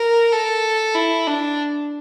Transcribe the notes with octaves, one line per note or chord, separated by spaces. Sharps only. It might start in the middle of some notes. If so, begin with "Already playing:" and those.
Already playing: A#4
A4
E4
D4